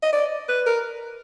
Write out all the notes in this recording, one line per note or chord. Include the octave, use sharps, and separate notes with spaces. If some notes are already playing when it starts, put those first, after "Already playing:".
D#5
D5
B4
A#4